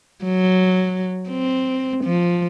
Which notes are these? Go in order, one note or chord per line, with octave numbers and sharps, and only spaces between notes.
F#3
C4
F3